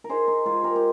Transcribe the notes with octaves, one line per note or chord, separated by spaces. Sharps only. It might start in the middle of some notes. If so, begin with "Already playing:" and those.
A#4
D#4 G#4 C5
D#4
G#3 F4 G#4
G#3 G4 A#4
G4